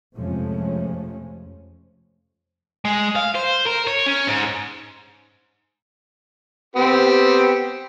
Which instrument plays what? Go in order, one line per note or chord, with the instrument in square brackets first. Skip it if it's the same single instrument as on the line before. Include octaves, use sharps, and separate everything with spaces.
[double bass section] F2 C3 F3 G#3 A3 C#4
[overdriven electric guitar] G#3
F5
C5
A#4
C#5
C#4
G#2
[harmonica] B3 C4 G4